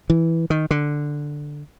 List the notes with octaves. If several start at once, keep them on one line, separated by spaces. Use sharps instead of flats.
E3
D#3
D3